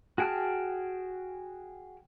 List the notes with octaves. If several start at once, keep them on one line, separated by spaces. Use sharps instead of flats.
F#4 G#4 G5 A5 F6